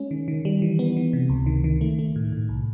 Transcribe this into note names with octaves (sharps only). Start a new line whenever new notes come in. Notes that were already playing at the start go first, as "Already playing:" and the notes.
Already playing: G#3 C#4
D#3
D#3
G3
E3
B3
E3
C3
C#2
D#3
D#3
A3
A3
A2
A2
C2